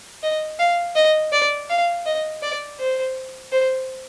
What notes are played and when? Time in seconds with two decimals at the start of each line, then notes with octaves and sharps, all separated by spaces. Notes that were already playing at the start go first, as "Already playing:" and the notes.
0.23 D#5
0.59 F5
0.96 D#5
1.32 D5
1.69 F5
2.06 D#5
2.42 D5
2.79 C5
3.52 C5